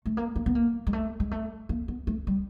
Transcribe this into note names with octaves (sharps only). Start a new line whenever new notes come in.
A3
A#3
A#3
B3
A#3
G#3
A3
G#3
A3
A#3
B3
A3
G3